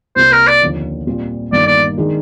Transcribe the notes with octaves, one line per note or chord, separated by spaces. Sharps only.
C2 C3 G3 A#3 C5
A#4
D5
D#2 D3 F3
A#2 G3 C4 F4
G1 G2 D#3 A#3 D5
D5
D#3 G#3 D4